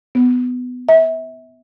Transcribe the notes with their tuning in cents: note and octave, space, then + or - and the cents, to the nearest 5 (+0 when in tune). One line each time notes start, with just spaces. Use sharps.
B3 +15
E5 -30